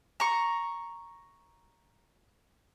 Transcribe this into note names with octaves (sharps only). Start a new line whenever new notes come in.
A#5 C#6